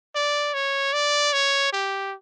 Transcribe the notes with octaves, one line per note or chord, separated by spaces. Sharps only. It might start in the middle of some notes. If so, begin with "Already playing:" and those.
D5
C#5
D5
C#5
G4